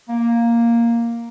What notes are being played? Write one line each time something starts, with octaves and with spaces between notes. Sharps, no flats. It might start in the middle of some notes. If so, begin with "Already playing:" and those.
A#3